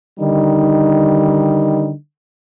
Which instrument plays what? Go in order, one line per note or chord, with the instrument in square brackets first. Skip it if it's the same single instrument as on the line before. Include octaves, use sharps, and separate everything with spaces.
[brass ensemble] D3 D#3 G3 D#4